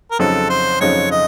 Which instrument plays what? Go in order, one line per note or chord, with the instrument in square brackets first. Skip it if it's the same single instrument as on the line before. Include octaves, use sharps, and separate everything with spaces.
[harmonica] A#4
[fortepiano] F2 C#3 F#3 C4 D#4 [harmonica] A4
[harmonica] C5
[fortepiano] F2 C#3 F#3 C4 D#4 [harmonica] C#5
[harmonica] D#5